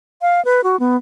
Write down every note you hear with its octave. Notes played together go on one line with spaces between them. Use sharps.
F5
B4
F#4
B3